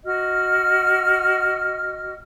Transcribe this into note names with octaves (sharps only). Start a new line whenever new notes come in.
F#4 D#5 F6